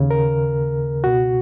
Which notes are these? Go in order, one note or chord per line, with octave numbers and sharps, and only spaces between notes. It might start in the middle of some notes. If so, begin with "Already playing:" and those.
Already playing: D#2 C#3
A#4
C#2 B2 F#4